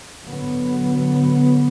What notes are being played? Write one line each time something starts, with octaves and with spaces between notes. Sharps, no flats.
D3 F#3 B3